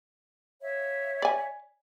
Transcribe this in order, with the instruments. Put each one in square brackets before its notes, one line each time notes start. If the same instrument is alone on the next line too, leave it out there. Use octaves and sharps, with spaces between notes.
[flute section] C#5 E5 F5
[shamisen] D5 G#5